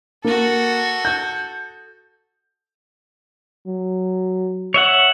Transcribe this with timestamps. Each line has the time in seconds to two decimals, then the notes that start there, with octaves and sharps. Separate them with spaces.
0.24 A#3 F#4 A4
1.05 G6
3.66 F#3
4.74 C#5 E5 F#5